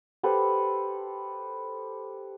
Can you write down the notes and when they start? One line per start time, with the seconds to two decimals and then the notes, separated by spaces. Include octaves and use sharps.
0.23 G4 A4 B4 C5